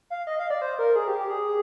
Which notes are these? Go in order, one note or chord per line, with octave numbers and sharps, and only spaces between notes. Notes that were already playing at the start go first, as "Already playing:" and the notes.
F5
D#5
F5
D5
C5
A#4
G#4
G4
G4
G#4